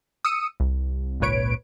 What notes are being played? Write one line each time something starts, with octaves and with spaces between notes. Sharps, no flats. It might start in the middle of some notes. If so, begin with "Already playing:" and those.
D#6 E6 C#7 D#7
C2
G#1 C#2 A#2 B4 C#5 D7